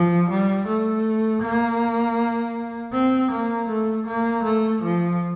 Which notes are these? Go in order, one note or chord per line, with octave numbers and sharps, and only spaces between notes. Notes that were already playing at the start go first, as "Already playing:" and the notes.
Already playing: F3
G3
A3
A#3
C4
A#3
A3
A#3
A3
F3